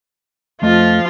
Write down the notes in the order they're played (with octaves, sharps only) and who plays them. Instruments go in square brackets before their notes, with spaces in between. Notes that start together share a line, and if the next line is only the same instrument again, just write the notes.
[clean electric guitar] F2 A3 D#5 [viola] F3 F4